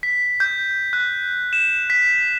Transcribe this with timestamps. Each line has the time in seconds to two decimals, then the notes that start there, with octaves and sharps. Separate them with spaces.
0.03 B6
0.40 G6
0.93 F#6
1.53 E7
1.90 B6